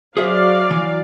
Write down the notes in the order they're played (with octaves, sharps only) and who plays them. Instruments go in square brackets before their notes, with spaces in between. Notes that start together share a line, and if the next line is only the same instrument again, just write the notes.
[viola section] F#3 D5 F5 [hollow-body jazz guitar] G#4 C5 E5
[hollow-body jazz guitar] E3